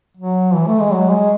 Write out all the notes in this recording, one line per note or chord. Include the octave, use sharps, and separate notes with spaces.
F#3
E3
A3
G#3
F#3
G#3